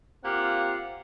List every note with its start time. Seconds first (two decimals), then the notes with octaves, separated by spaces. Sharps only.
0.24 A#3 C4 F4 G4 F5 F#5